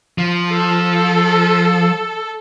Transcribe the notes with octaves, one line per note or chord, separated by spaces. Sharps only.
F3
A4